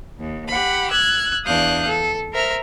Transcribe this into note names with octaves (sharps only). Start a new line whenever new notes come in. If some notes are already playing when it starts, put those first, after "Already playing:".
D#2
G4 F#5 B5
E6 F#6 G#6
E2 D4 F5 D#6 F#6 G6
A4
A#4 C5 E5 A#5 F6